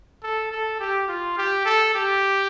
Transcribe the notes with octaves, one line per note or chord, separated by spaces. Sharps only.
A4
A4
G4
F4
G4
A4
G4